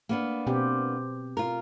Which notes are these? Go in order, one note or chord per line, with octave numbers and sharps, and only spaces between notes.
A#3 B3 D4
B2 C4 G4
F4 A#4